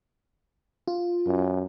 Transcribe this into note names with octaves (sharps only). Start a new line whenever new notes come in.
F4
F#2